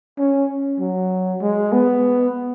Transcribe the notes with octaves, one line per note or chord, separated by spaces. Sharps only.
C#4
F#3
G#3
B3